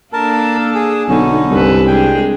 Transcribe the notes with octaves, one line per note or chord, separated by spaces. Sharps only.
A#3 D4 A4 A#4 A5
G#4
B1 D3 C#4 D#4
C2 G2 A4 B4
G#3 D4 G#4 G5